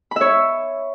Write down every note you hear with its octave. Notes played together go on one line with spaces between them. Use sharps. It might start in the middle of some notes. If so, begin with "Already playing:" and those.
C#5 E5 B5